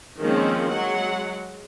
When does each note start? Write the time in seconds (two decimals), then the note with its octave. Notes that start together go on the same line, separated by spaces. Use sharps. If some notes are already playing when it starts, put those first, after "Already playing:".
0.20 D#3 F3 G#3 A#3 C4 C#4
0.70 F#3 G#3 F#5